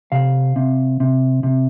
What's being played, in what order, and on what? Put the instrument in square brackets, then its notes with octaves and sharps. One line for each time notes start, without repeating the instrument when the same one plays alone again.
[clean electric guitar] C3 F5
C3
C3
C3